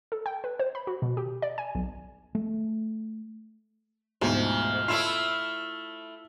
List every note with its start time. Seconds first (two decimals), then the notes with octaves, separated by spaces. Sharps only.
0.12 A4
0.26 G5
0.44 B4
0.59 C5
0.75 B5
0.87 F#4
1.02 B2
1.17 G4
1.42 D5
1.58 G#5
1.75 B1
2.35 A3
4.21 D2 G#2 B2 F3
4.88 A3 E4 F4 C7 E7